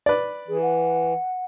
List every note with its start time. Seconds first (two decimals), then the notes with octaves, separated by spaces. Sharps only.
0.06 B4 D5
0.48 E3 G#4
0.62 F#5